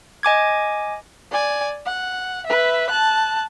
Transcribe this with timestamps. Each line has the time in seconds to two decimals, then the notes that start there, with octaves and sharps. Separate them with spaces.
0.23 D#5 G#5 D6 G#6
1.31 D5 G#5
1.85 F#5
2.46 B4 E5
2.90 A5 F#6